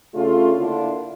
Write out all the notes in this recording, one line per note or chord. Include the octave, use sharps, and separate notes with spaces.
C#3 A3 D4 F4
D3 A#3 D4 E4 F4